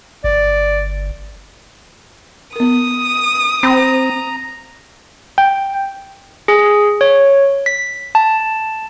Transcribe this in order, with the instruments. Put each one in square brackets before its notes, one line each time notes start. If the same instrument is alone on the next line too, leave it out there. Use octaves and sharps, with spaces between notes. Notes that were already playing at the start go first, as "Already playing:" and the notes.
[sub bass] G1 [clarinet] D5
[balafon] B3 A#4 [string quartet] D#6
[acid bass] C4 [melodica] A#5 [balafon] B5
[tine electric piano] G5
[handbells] G#4
C#5
B6
A5